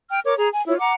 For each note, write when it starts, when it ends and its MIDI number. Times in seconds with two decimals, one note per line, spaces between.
0.10 0.20 79
0.10 0.20 89
0.25 0.33 70
0.25 0.33 73
0.25 0.33 86
0.38 0.48 68
0.38 0.48 82
0.52 0.64 80
0.66 0.78 64
0.66 0.78 65
0.66 0.78 73
0.79 0.93 78
0.79 0.93 82
0.79 0.93 86